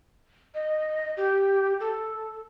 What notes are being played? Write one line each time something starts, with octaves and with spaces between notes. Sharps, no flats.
D#5
G4
A4